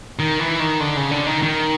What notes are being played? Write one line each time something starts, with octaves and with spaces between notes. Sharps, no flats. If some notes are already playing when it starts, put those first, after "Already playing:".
D#3
E3
D#3
D3
C#3
D3
D#3
D#3